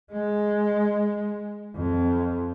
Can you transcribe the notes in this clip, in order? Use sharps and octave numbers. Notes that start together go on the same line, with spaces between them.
G#3
F2